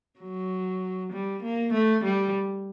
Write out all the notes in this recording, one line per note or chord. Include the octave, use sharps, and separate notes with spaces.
F#3
G3
A#3
A3
G3